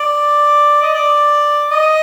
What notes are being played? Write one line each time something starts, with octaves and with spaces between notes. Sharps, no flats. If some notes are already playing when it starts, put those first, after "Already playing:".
Already playing: D5
D#5
D5
D#5